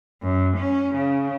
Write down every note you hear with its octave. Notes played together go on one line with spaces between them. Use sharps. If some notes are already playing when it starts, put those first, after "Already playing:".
F#2
C#4
C#3